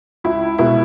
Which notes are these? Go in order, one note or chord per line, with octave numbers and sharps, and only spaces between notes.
C#2 E4
B2 G#3 B3 E4